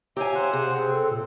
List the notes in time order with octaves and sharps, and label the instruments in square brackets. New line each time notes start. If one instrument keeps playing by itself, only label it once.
[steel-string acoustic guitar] G4 F5 G#5 [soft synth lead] C#5 [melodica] E5 A#5
[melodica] C5 F#5
[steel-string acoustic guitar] C3 [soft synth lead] G#4
[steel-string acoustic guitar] C3 [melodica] C4
[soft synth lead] A4
A#2